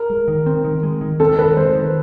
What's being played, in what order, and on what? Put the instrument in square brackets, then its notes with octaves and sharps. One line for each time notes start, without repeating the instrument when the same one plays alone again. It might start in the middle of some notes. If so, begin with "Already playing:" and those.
Already playing: [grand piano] A#4
[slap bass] G#3
D#3
C4
D#3
G#3
D#3
[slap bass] C4 [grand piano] A4
[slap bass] D#3 [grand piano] B4
[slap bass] G#3 [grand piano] C5
[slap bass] D#3